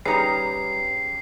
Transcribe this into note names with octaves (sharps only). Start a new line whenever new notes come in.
G3 C#4 D#4 G4 G#4 B4 A#5 C7